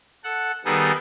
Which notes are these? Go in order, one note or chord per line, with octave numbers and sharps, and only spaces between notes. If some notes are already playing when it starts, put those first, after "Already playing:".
A4 F#5
D#3 G3 B3 D#4 G#4 A4